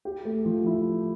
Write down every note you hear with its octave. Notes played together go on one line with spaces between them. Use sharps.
G4
A3
F3
E4